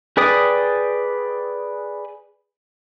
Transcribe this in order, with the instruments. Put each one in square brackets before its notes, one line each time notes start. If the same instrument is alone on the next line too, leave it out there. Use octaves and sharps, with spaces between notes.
[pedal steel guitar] G#4 B4 D5 G5 D#6